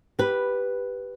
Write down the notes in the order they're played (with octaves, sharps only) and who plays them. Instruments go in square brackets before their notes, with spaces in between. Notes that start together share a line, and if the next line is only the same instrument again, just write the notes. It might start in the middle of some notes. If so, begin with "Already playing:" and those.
[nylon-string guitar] G4 B4